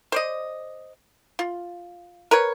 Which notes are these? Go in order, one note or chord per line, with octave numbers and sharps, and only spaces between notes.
C5 D5 D#5
F4
A#4 B4 C#5